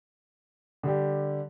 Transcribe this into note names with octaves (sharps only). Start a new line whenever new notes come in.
D3 G3 D4 G4